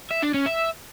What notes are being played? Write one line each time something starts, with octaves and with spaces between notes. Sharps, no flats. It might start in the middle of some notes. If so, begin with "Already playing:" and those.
E5
D4
C#4
E5